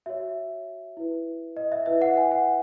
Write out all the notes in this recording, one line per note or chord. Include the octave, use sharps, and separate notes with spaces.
F#4 C#5 E5
E4 B4
D#5
E5
E4 B4 E5
F#5
G#5
F#5